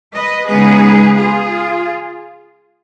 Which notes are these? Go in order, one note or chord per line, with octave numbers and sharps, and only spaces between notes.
B4 D#5
C#3 G#3 B3 D#4 G#4 B4
F4 G#4